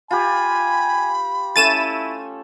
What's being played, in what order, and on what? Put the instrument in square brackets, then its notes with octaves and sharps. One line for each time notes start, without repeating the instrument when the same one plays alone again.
[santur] F4 G4 [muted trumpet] G#5 [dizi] B5
[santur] A3 C#4 A4 [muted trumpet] E4 [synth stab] A6 D#7 E7